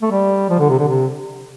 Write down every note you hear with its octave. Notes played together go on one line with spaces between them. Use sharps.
A3
G3
F3
D3
C3
D3
C3